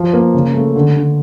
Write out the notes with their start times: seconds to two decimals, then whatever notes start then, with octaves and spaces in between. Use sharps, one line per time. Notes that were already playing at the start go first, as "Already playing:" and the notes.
Already playing: F3
0.13 A#3
0.34 C#3
0.54 A3
0.76 D3
0.96 D3